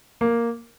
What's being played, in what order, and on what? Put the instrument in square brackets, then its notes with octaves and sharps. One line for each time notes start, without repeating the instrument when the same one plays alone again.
[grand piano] A#3